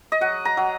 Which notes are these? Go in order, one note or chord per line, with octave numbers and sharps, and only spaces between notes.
D#5
F#3 F#5
A#5
F#3